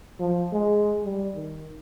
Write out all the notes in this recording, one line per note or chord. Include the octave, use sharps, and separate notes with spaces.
F3
G#3
G3
D#3